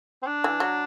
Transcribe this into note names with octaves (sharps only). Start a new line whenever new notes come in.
C4
D4
E3
F#3